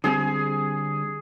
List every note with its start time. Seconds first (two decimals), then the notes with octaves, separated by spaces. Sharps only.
0.04 D3 G3 C4 G#4